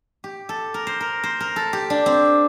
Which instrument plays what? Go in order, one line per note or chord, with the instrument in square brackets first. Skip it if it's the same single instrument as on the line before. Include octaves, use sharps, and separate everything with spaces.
[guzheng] G4
A4
A#4
C5
A#4
C5
A#4
A4
G4
D4
C4